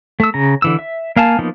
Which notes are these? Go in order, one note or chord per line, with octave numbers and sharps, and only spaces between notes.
A3 E6
C#3 A#5
D3 E3 E6
E5
A#3 F5 G#5 A5
F3 A#3 B3 D#4